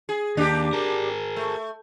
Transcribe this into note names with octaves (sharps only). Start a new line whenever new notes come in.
G#4
D#2 D4 G4
G#4 A#4
A3